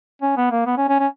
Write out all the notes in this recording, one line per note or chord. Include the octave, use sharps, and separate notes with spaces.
C#4
B3
A#3
B3
C#4
C#4
C#4